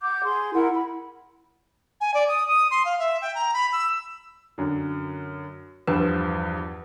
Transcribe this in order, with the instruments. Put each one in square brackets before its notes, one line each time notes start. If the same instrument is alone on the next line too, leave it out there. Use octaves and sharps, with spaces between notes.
[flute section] F#5 D6 G6
G#4 C6
E4 A#4 F#5
B5
[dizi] G#5
D5
D#6
D#6
C6
F5
E5
G5
A#5
B5
E6
[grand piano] F#2 D3
[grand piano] E2 G2 F3 [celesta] B4